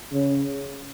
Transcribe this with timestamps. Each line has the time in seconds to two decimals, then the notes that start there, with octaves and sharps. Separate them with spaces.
0.12 C#3